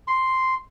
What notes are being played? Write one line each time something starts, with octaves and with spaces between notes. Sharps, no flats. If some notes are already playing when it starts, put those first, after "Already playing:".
C6